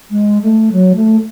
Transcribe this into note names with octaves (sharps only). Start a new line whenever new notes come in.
G#3
A3
F#3
A3